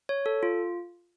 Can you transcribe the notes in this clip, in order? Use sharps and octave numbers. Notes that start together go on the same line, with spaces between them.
C#5
A4
F4